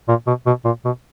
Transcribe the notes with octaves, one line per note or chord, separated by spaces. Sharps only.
A#2
B2
B2
A#2
B2